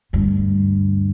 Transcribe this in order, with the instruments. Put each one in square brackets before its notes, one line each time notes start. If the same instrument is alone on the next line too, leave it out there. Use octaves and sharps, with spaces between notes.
[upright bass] D2 G2